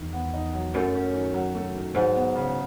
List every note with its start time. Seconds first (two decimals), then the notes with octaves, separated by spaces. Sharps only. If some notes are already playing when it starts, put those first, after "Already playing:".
Already playing: E2 D#3
0.13 B3
0.33 D#4
0.53 F#3
0.74 F#2 A3
0.94 C#4
1.13 D#3
1.34 F#3
1.55 A3
1.75 D#3
1.94 G#2 F#3
2.15 B3
2.35 C#3